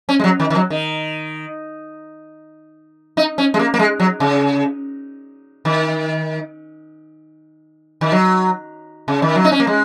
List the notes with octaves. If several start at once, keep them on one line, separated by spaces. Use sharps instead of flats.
C#4
G#3
F#3
D#3
D#3
F#3
D#3
D#4
C#4
G#3
A#3
A#3
G#3
F#3
C#3
D#3
D#3
F#3
C#3
D#3
F#3
D#4
C#4
A#3
G#3